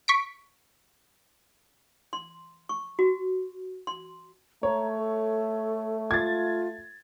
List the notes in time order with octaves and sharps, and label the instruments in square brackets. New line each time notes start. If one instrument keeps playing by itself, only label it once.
[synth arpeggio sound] C#6 B6 D7
[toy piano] C6
C#6
F#4
C6
[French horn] A3 [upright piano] C#5 [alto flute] A#5
[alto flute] A4
[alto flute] F4 [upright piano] G#6 A6